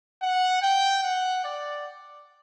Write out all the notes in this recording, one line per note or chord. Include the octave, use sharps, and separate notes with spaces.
F#5
G5
F#5
D5